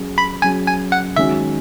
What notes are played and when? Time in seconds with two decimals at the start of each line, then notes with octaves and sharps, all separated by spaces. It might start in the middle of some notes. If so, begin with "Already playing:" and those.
Already playing: F#3 C#4 G#4
0.18 B5
0.42 F#3 C#4 G#4 G#5
0.67 G#5
0.92 F#5
1.16 D#3 G#3 C#4 F#4 E5